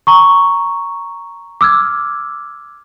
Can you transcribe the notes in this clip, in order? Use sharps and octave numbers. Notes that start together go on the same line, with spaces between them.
A#5 C#6
D6 E6 F6 G#6